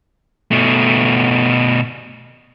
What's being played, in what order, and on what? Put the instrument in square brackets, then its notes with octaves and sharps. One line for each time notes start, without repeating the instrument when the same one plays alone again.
[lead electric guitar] B2 A3